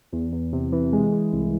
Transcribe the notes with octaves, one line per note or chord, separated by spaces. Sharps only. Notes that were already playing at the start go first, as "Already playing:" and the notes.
E2
E2
C3
E3
G#3
G#3
C2